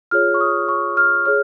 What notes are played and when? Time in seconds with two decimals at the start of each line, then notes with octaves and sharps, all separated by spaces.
0.11 F4 G#4 C#5 F6
0.34 C#6
0.41 D#6
0.69 C#6
0.97 F6
1.25 G#4 C#5 F6